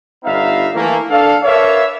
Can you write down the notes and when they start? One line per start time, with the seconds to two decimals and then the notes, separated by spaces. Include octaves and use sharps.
0.25 G1 G3 B3 D#4 E5 F5
0.75 E3 A3 A#3
1.10 D4 A4 F5
1.43 A#4 B4 C#5 D5 E5 F5